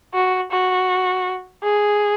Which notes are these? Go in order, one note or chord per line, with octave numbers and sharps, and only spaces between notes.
F#4
F#4
G#4